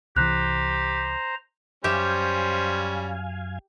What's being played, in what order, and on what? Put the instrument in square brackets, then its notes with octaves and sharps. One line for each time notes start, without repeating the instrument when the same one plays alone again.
[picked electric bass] C2 E3 [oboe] G4 [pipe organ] C5 A#5 [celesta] F#6
[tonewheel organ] F#2 F5 G#5 [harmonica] G3 C#4 [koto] G4 E5 [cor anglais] C5